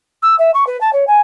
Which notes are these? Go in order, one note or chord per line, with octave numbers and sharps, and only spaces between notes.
E6
E5
C#6
B4
A5
C#5
G#5